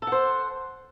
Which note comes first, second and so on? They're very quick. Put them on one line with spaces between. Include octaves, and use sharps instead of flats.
A4 F#5 C5